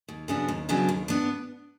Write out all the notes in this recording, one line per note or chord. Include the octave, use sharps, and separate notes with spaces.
D#2
C#3 F#3 B3 D4
D#2
C#3 F#3 B3 D4
D#2
B3 D4